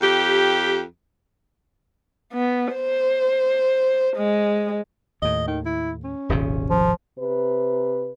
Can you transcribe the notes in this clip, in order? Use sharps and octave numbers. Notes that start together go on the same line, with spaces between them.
F2 G4
B3
C5
G#3
D#2 A2 D#5
D#3
E4
C#4
D#1 G#1 C3
F3
C3 B4